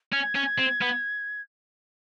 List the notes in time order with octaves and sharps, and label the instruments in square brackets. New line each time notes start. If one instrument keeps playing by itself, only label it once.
[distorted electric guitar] C#4 [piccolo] G#6
[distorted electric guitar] C#4
C4
B3